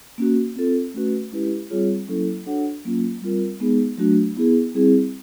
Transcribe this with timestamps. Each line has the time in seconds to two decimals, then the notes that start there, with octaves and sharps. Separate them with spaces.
0.18 A#3 C#4 F#4
0.56 C4 F4 A4
0.94 A3 C#4 F#4 B4
1.32 G#3 C#4 E4 G4 B4
1.70 G3 C4 F4 G#4 C#5
2.08 F#3 A#3 C#4 E4 A4
2.46 D4 F#4 A4 C#5 F#5
2.85 F#3 A#3 C#4 F4
3.22 G3 C4 F4 A#4
3.60 G#3 B3 D#4 G#4
3.98 F#3 A3 D4 F#4
4.37 B3 E4 G#4
4.75 G3 C4 E4 G#4